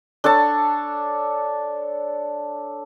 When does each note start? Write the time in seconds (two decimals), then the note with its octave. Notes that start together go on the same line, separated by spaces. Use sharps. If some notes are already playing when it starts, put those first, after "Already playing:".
0.24 D4 A4 C#5 A5